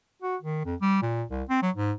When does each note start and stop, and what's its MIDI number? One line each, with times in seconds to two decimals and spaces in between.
0.22 0.36 66
0.42 0.65 51
0.65 0.75 41
0.81 1.02 55
1.02 1.23 46
1.30 1.43 36
1.49 1.61 60
1.62 1.70 54
1.76 1.93 44